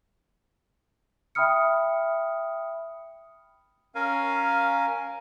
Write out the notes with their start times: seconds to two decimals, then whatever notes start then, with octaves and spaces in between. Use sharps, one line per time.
1.35 E5 G5 B5 D#6 F6 C#7
3.95 C#4 A#4 F5 G#5